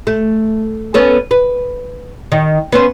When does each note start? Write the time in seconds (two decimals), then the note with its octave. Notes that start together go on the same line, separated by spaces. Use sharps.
0.07 A3
0.94 B3 C#4 A4
1.31 B4
2.32 D#3
2.72 B3 C#4 C5